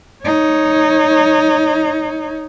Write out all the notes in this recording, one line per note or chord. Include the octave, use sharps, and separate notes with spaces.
D#4 C#5